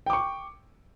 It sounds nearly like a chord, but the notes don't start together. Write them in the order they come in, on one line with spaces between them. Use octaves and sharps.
G5 D6 C#6